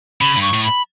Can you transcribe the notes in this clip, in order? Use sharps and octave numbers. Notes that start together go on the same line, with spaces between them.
C#3 B5
G2
C#6
A2
B5